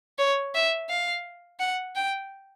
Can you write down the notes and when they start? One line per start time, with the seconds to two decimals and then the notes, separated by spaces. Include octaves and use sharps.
0.18 C#5
0.55 E5
0.89 F5
1.60 F#5
1.96 G5